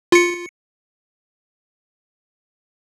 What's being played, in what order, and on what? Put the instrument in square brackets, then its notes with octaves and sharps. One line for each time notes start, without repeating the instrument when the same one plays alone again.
[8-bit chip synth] F4 C#7